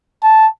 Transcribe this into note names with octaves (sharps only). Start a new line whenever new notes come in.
A5